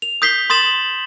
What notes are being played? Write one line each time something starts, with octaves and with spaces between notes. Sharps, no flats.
F7
D#6 G6 B6 C7 G7
C6 D#6 A6 E7 F#7